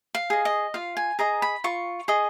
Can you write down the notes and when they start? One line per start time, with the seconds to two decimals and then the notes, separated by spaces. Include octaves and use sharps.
0.15 F5
0.30 G#4 D#5
0.45 D#5
0.74 F4 F5
0.97 G#5
1.19 G#4 D#5 A#5
1.42 B5
1.64 F4 C#6
2.08 G#4 D#5